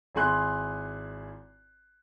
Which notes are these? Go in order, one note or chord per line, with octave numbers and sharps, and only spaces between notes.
G#1 E4 G#4 G#5 C6 F#6